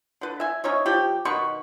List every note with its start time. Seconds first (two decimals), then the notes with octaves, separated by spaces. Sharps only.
0.21 D3 B4
0.40 E5 G#5
0.64 C#4 D#4 C#5 E5
0.86 F3 G4
1.25 B2 D#3 B4 C#6